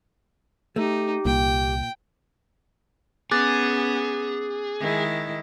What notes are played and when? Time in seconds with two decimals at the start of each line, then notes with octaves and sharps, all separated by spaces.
0.76 A3 D#4 G4
1.25 C2 A#2 G5
3.31 B3 C#4 G#4 D6 F#6 A6
4.81 D#3 G#3 E4